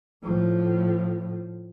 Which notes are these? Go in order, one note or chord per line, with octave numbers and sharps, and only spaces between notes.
A2 F3